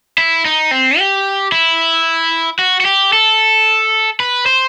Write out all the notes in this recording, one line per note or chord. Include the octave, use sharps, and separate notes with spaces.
E4
D#4
C4
G4
E4
F#4
F#4
G4
A4
B4
C5